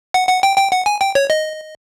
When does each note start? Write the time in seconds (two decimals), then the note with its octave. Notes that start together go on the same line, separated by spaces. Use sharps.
0.14 F#5
0.28 F#5
0.43 G5
0.58 G5
0.72 F#5
0.86 G#5
1.01 G5
1.15 C#5
1.30 D#5